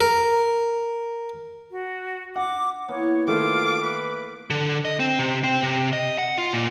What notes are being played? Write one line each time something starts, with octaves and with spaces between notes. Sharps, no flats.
A#4
F#4
F#5 D6
E3 A#3 B3 C#5
D#3 A3 F4 D6
B4
D3
D#5
C4
C3
C4
C3
D#5
F#5
F4
A#2